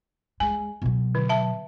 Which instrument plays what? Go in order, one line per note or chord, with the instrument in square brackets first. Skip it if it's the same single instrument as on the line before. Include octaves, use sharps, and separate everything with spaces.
[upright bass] G#3 [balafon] G#5
[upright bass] B2 F#3
[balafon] D3
E5 A5